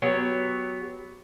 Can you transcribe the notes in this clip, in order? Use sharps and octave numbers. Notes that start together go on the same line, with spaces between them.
F#3 B3 G4 C#5